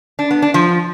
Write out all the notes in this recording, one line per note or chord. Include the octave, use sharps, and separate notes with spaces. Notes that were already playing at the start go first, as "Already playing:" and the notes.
D4
B3
D4
F3